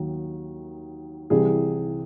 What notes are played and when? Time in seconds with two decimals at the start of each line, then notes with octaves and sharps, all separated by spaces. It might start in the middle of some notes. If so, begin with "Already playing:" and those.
Already playing: D#2 D#3 F#3
1.30 C2 C3 E3 G#4